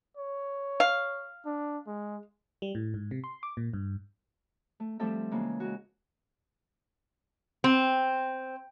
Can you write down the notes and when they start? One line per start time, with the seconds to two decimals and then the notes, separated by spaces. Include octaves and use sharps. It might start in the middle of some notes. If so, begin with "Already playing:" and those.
0.17 C#5
0.80 F5
1.45 D4
1.87 G#3
2.62 G3
2.75 A2
2.94 G#2
3.11 C3
3.24 C6
3.43 D6
3.57 A#2
3.73 G2
4.80 A3
4.99 F3 G3 A3 C4 A4 E5
5.31 C#3 E3 G#3 A#3 C#4
5.60 G#3 F#4
7.64 C4